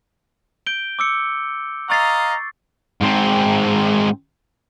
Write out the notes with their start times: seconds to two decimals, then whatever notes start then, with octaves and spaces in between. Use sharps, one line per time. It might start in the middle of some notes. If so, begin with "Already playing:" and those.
0.66 G6 D7 G7
0.99 D6 E6 C#7
1.90 D#5 F5 A#5 C#6 A6 C7
3.01 G#2 C4